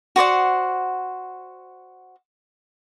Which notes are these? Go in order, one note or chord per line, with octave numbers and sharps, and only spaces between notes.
F#4 C5 D5 F#5